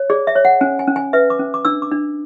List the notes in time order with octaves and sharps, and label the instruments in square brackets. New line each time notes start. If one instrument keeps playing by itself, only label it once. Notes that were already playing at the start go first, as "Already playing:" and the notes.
Already playing: [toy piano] C#5
G#4 D5
E5
C#5
F#5
C#4 G#5
G#5
C#4
G#5
B4 E5
D6
C#4
D6
D4 E6
D6
D4